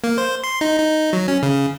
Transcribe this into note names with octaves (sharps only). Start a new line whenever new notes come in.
A#3
C5
C6
D#4
D#4
F#3
C#4
C#3